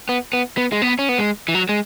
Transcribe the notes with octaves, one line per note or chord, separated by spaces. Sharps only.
B3
B3
B3
G#3
B3
C#4
B3
G#3
E3
F#3
G#3